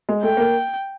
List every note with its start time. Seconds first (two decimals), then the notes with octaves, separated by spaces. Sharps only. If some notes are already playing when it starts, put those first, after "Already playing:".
0.09 G#3
0.23 A3 G5
0.37 A#3